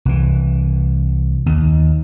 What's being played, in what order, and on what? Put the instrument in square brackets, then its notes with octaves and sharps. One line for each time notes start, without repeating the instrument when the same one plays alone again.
[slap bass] C2 E3
D#2